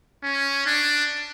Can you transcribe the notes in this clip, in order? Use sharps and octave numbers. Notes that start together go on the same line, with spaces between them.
C#4
D4